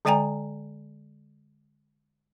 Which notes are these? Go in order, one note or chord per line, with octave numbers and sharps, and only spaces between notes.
D3 G#3 D5 G5 G#5 A#5